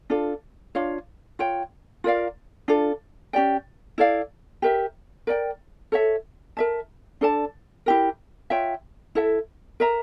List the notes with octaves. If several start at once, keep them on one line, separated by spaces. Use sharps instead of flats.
D4 F4 A4
D4 F4 C#5 F5
F4 C#5 G5
F4 A#4 D5 F5
D4 F4 A4
C#4 G4 D5 G5
E4 A4 D5 F5
G4 A#4 E5
A#4 D5 G5
A4 C#5 E5
A#4 E5 A5
D4 A4 D5 A5
E4 G4 A#4
F4 C#5 E5 G5
E4 A4 E5
A#4 E5 A#5